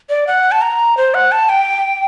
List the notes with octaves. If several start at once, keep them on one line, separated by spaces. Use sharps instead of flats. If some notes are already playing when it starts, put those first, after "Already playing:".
D5
F#5
A5
A#5
C5
F#5
A5
G5